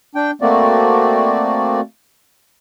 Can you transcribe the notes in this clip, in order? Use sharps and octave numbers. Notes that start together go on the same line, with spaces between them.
D4 G5
A3 A#3 C4 F#4 D5